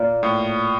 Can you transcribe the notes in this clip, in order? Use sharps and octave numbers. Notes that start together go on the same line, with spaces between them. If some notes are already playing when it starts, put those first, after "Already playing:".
Already playing: A#2
A2